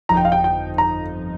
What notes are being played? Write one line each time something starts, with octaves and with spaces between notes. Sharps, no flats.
G1 F2 F3 D#4 A#5
G5
F5
G5
G5
A#5